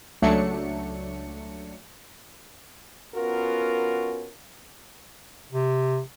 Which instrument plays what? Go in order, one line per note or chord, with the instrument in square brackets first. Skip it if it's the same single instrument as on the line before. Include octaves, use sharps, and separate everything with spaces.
[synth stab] C#2 F#3 A3 D4 C#7
[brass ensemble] B3 C#4 F4 F#4 A#4
[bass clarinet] C3